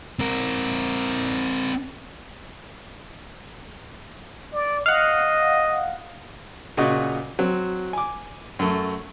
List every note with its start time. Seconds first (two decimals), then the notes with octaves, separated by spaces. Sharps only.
0.19 C4 A#4
4.53 D5
4.86 D#5 F5 F#5
6.77 A#2 C#3 F#4 D#5 C#6
7.39 F#3 C4
7.93 G#5 D6
8.59 F#2 A3